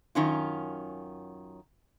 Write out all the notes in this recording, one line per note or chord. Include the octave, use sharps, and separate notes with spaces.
F#2 D#3 C#4 F4